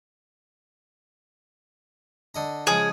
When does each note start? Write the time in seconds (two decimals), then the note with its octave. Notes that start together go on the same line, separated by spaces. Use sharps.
2.35 D3 D#5 A#5
2.67 C#3 F3 G#3 G#4